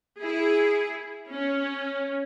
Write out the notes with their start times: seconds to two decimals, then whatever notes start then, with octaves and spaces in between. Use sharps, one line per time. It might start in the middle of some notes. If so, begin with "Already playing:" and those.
0.20 E4 G#4
1.29 C#4